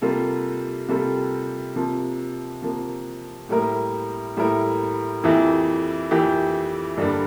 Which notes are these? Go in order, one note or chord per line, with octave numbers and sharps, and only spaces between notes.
C3 G3 A#3 F4 A4
C3 G3 A#3 F4 A4
C3 F3 A#3
C3 F3 A#3
A2 G3 A#3 E4 A#4
A2 G3 A#3 E4 A#4
F2 E3 A#3 E4 G4
F2 E3 A#3 E4 G4
G2 D3 G3 A#3 D4